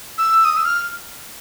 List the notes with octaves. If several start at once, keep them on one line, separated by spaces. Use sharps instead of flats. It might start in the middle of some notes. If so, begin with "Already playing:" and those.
E6
D#6
E6
F6